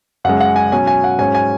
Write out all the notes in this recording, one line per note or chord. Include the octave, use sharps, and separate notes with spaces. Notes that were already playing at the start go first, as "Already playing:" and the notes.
F#2 C#3 G#3 F#5
F#5
G#5
B2 F#3 C#4 G#5
G#5
F#5
G#2 F#3 C#4 G#5
G#5